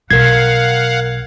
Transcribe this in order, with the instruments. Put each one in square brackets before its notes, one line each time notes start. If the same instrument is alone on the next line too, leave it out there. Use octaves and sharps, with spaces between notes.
[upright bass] B1 [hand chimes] A#4 C7 [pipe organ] F5 F#5 [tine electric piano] G#6